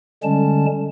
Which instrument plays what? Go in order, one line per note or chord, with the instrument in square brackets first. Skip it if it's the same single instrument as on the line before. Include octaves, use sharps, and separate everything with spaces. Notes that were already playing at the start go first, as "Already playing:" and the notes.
[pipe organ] D3 G3 G#3 C#4 A5